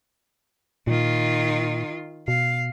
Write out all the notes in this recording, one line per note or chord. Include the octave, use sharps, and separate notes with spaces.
A#2 D#3 F4
B2 F5